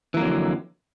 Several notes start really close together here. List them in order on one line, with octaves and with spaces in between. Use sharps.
E3 A#3 F2 F#3 D3